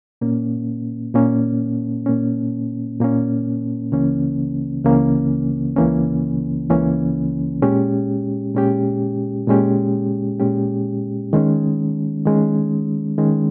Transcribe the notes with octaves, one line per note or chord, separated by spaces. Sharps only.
A#2 A#3 C#4
A#2 A#3 C#4
A#2 A#3 C#4
A#2 A#3 C#4
C#2 C#3 E3 A#3 C#4
C#2 C#3 E3 A#3 C#4
C#2 C#3 E3 A#3 C#4
C#2 C#3 E3 A#3 C#4
A#2 G#3 C#4 G4
A#2 G#3 C#4 G4
A#2 G#3 C#4 G4
A#2 G#3 C#4 G4
D#3 G#3 C#4
D#3 G#3 C#4
D#3 G#3 C#4